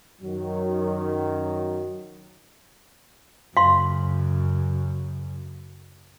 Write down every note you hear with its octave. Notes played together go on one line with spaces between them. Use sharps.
F#2 D#3 F#3
F#2 C#3 F5 C6